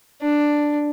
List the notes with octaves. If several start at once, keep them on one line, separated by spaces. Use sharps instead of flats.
D4